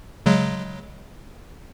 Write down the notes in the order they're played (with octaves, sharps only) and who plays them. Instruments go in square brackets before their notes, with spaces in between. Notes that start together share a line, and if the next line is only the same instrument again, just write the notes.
[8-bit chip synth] C#3 F#3 G#3